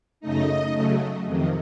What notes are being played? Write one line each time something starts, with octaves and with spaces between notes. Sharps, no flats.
F#2 C#3 A3 D#4 D#5
C#3 F#3 A3
F2 C3 D#3